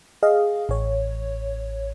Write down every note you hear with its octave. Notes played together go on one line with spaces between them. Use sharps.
G#4 D#5 F5
A1 C#5